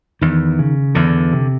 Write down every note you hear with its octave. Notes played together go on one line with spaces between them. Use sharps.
E2 D#3
C#3
E2 D3
C3